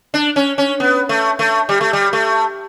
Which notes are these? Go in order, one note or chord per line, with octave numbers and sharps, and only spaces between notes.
D4
C#4
C#4
B3
A3
A3
G3
A3
G3
A3